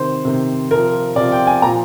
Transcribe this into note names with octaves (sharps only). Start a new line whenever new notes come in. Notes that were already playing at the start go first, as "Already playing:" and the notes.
Already playing: C3 D#3 C5
C3 D#3
C3 F3 A#4
C3 F3 D5
G5
G#5
A#2 F3 A#5